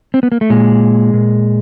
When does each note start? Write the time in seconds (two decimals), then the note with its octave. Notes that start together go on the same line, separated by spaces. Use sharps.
0.14 C4
0.23 B3
0.32 A#3
0.41 A3
0.50 A#2 G#3
1.13 A#2